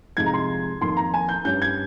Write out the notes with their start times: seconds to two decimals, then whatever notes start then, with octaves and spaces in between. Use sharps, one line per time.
0.17 F2 C3 F3 G#3 D#4 G#6
0.26 A#5
0.34 C6
0.81 F2 D#3 A#3 C6
0.97 A#5
1.14 G#5
1.29 G6
1.45 G2 G3 C#4 G6
1.62 G#6